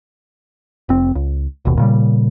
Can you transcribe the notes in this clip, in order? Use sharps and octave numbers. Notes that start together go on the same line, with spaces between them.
F1 C4
C#2
D#1 G#1 D#2 B2
A#2 C#3 G3